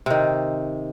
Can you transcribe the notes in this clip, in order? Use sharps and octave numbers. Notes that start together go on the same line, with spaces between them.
C3 D#3